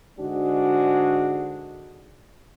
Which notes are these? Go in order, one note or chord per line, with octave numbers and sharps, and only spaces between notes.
G#2 D3 G#3 D4 F#4